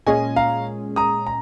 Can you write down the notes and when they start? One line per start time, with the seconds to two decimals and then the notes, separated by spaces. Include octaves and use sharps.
0.07 A#2 G#3 C#4 G#4 D#5 G#5
0.36 F5 A#5
0.96 A#5 D#6
1.27 A#5